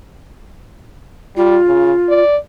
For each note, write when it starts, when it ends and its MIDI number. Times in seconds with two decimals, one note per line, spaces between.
1.36 1.58 55
1.36 2.22 65
1.67 1.93 49
2.09 2.37 74